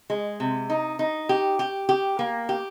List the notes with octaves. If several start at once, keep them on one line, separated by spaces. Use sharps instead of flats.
G#3
C3
D#4
D#4
G4
G4
G4
A#3
G4